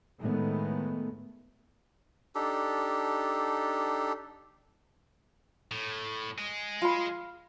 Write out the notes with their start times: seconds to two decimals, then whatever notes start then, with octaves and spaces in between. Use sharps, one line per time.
0.20 A2 D#3 G#3 A3 B3
2.35 D4 D#4 G4 A4
5.72 A2
6.38 G#3
6.82 F4 B5